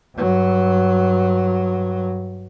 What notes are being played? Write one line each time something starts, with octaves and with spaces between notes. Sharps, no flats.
G2 F#3